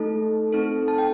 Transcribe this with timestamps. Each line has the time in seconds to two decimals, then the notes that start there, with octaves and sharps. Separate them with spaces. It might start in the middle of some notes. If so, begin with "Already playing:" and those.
Already playing: A3 D#4 A4
0.53 C4 D#4 A4
0.88 A5
0.98 G5